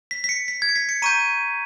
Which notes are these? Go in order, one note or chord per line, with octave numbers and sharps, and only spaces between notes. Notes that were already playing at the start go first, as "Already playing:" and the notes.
B6
B6
C#7
B6
G#6
C#7
B6
C#7
A#5 C#6 G6 D#7